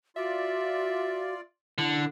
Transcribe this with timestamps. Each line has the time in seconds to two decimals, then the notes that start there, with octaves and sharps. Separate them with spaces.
0.16 F4 F#4 D5 E5
1.78 D3 E4